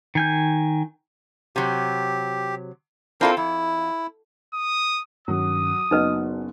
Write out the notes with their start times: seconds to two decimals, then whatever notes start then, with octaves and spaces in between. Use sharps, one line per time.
0.15 D#3 G#5 G6
1.56 C3 F#3 G4
3.21 C4 D4 E4 F4 A4 A#4
3.37 F2 E4
4.54 D#6
5.28 G2 D#3 F#3 C#4 D#6
5.91 F#1 B3 D#4 F#4 B4 D#5 F#5